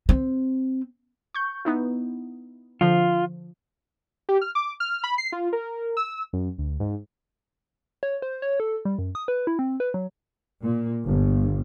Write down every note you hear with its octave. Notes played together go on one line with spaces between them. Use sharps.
C4
C#6 G6
B3 D#4 E4
D3 F3 F4
G4
F6
D6
F6
B5
C7
F4
A#4
E6
F#2
D2
G#2
C#5
C5
C#5
A4
G3
F#2
D#6
B4
E4
C4
B4
F#3
A#2
G1